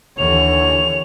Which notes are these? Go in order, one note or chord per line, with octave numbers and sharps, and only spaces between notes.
D#2 D3 E3 C#5 F7